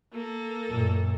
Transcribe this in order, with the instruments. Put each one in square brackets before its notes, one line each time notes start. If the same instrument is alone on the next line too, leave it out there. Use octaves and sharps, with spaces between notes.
[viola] A#3 A4
[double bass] F#2 A#2